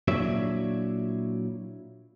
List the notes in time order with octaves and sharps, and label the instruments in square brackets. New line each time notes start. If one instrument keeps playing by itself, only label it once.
[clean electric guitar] A#2 F#3 D4 E4 C#5 E5